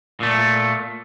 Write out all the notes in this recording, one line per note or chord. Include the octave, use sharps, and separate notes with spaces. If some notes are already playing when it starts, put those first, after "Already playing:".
A#2 A3